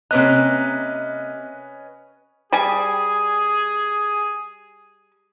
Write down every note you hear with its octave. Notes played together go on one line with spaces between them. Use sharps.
C3 A#3 C#4 B4 D#5 A#5 F#6
G3 G#4 G#5